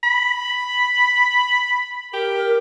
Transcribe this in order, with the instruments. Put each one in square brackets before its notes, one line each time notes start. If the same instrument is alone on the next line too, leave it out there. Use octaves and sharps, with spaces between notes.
[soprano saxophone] B5
[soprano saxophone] G4 [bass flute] A#4